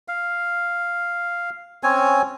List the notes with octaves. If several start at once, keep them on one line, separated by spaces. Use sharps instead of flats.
F5
C4 C#4 C#5 G#5